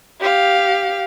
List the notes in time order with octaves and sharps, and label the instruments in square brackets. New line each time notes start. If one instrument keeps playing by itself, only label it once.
[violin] G4 F5